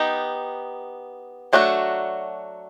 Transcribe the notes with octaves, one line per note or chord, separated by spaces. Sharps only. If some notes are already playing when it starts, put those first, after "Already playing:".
Already playing: B3 D#4 G4
F#3 A3 D4 F#4